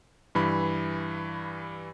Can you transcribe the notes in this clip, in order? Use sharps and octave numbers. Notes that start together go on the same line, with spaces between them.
G2 E3 B5